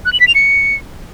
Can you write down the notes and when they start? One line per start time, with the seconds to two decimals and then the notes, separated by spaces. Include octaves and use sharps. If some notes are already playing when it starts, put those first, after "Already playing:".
0.05 F#6
0.13 F#7
0.20 B6
0.27 F7
0.35 C#7